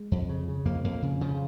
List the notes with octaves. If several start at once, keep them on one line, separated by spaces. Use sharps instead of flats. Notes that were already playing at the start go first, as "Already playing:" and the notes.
Already playing: G#3
F2
C#3
C#3
F2 A#3
F2 A#3
C#3
C#3 F3